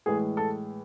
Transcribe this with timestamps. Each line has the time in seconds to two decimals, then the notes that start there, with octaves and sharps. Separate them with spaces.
0.06 A2 E3 G#3 G#4
0.37 A4